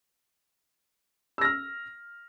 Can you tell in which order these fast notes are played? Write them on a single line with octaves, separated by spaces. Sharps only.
E6 A#6 F6